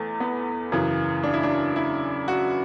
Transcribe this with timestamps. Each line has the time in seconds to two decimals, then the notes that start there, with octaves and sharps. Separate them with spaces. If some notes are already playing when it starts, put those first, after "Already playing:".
Already playing: E2 A3
0.20 B3
0.72 F#2 C#3 E3
1.23 D4
1.34 E4
1.43 D4
1.76 E4
2.28 F#4